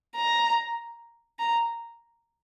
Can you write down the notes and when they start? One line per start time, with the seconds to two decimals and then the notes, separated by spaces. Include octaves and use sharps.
0.16 A#5
1.39 A#5